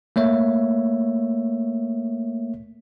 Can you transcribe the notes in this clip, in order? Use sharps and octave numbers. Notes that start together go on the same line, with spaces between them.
A3 A#3 C#5 E5